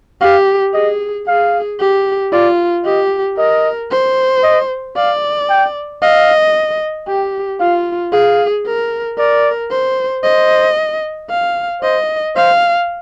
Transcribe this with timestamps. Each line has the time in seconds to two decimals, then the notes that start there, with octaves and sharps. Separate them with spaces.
0.21 G4 F5
0.74 G#4 D#5
1.27 G#4 F5
1.80 G4
2.32 F4 D5
2.85 G4 D#5
3.37 A#4 D#5
3.91 C5
4.44 D#5
4.96 D5 F5
5.49 G5
6.02 D#5 F5
7.07 G4 G5
7.60 F4 F5
8.12 G#4 F5
8.66 A#4
9.18 A#4 D5
9.71 C5
10.24 C5 D#5
11.30 F5
11.82 C5 D#5
12.36 C5 F5